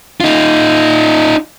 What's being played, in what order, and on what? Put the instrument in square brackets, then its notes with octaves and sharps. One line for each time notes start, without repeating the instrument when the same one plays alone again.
[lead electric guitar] D#4 F4